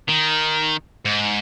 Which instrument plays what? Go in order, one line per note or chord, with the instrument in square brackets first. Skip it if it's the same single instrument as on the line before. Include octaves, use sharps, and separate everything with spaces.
[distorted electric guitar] D#3
G#2